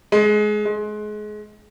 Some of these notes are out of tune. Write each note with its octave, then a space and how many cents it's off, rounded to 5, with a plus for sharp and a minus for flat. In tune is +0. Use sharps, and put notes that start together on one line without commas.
G#3 +20
G#3 +25